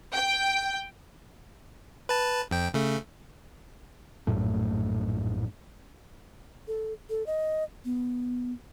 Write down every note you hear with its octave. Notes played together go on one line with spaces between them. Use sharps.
G5
B4 A5
F2 G5
C#3 A3
A#1 F#2 A2 A3
A4
A4
D#5
B3